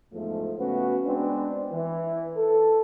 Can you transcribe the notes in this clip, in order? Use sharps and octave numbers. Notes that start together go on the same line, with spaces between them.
E2 G#2 F3 A3
C#3 A3 B3 C#4 F#4 B4
G#3 B3 C4 D4
E3
A4